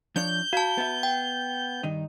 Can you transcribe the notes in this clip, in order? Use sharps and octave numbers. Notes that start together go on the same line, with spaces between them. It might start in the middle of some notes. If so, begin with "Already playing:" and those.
F3 D4 C#5 G6
F#4 F5 A5
B3 E5
G5
G2 D#3 D#4